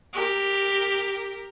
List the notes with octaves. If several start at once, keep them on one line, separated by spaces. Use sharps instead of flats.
G4 A#4